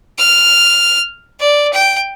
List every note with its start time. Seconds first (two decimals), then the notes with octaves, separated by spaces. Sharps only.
0.18 F6
1.40 D5
1.73 G5